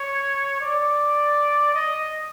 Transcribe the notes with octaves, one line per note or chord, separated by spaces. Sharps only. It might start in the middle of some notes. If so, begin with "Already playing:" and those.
Already playing: C#5
D5
D#5